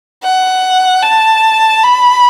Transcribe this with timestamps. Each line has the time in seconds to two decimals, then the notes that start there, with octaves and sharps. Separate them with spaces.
0.23 F#5
1.02 A5
1.83 B5